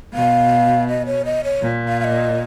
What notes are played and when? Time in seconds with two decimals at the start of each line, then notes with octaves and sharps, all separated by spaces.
0.14 B2 F5
0.88 D#5
1.06 C#5
1.25 D#5
1.44 C#5
1.62 A#2
1.88 F5
2.00 F5
2.04 D#5